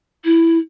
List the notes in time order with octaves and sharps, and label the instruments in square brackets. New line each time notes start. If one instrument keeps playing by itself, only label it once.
[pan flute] E4